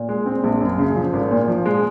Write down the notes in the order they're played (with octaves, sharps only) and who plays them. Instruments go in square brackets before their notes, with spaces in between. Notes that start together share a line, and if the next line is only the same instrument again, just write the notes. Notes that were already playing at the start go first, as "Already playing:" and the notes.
Already playing: [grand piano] A#2
G#3
C4
A#1
F#2
C#3
F3
G#1
A#2
F3
G#3